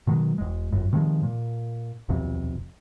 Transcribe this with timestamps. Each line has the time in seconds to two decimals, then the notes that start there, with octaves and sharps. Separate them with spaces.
0.07 B2 D#3 F#3 G#3
0.38 E1 G#3
0.72 G1 F#2
0.93 C3 D#3 F3 G#3
1.23 A#2
2.09 D#1 B1 F2 C3